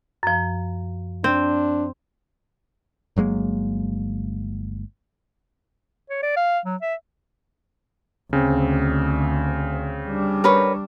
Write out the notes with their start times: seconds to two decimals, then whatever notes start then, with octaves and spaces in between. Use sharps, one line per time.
0.23 F#2 F3
1.24 C4 D4
3.16 G1 F#3 G#3 A#3
6.10 C#5
6.23 D5
6.37 F5
6.66 F#3
6.82 E5
8.33 D2 C#3 C4
10.07 G3 D4
10.44 A#4 B4 C#5